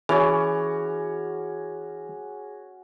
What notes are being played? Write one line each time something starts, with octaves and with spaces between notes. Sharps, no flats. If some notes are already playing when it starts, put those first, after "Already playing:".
E3 C#4 F#4 G#4 C#5